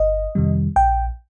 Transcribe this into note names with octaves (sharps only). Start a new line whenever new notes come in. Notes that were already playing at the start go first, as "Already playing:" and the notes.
Already playing: G1 D#5
F2 C3 D#3 G3
A#1 G5